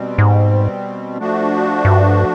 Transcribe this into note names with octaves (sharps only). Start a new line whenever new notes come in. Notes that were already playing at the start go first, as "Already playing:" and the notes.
Already playing: B2 G3 C4
G#2
F3 A3 D4 F#4
G2